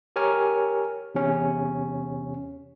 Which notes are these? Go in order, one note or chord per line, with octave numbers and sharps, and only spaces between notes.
G4 A#4 C#5 G#5 F6
E2 C3 C#4